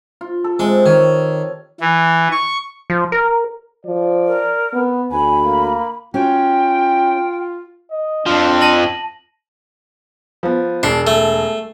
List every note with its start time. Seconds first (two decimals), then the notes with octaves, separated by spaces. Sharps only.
0.21 F4
0.44 A4
0.59 C3 G#3
0.86 D#3 C#5
1.81 E3
2.32 C#6
2.90 F3
3.12 A#4
3.86 F3 D5
4.27 A#4
4.74 B3
5.12 D2 G#5 B5
5.45 A#3
6.14 C#4 F4 F#4 G5
7.91 D#5
8.26 F2 F3 D4
8.61 A5 A#6 F#7
10.43 F3 B3
10.83 E1 D4 C7
11.07 A3